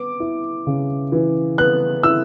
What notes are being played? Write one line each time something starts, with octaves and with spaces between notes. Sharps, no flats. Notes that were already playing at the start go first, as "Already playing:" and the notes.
Already playing: B3 D6
E4
C#3
E3
B3 F#6
E4 E6